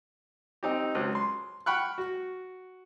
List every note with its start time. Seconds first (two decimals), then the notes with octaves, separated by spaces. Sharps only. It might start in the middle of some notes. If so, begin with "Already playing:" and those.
0.63 C4 D#4 G4
0.95 C#2 F#3 C5
1.15 C6
1.66 F#5 G5 B5 C#6 F6 F#6
1.98 F#4